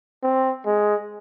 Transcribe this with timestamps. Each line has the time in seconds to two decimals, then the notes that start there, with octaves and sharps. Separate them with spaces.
0.23 C4
0.65 G#3